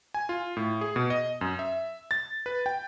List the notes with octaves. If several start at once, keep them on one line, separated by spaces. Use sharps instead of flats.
G#5
F4
A2
G#4
B2
D#5
F#2
E5
A6
B4
G5